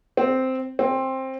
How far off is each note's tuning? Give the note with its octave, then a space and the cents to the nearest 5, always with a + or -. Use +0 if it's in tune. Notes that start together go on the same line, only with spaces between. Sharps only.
C4 -5
C4 +15